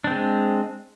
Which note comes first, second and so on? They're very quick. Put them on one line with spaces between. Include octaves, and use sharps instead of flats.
D4 C4 G#3